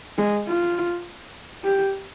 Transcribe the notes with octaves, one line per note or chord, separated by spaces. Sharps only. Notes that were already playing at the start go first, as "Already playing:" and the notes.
G#3
F4
G4